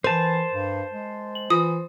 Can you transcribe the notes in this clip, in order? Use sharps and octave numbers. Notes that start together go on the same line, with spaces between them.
E3 A#4 C5 A5
G2
G#3
F#7
E3 F4 D#6